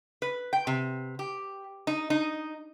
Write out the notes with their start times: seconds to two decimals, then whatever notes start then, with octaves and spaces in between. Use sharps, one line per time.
0.22 B4
0.53 G5
0.67 C3
1.19 G4
1.87 D#4
2.10 D#4